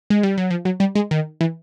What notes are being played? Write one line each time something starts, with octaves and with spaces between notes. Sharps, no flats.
G#3
G3
F#3
F3
F#3
G3
G#3
D#3
E3